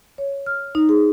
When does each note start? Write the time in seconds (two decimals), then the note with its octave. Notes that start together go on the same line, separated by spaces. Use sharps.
0.18 C#5
0.46 F6
0.75 D#4
0.89 G#4